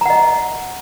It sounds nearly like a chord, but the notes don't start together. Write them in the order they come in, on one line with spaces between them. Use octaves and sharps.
A#5 F#5 D#5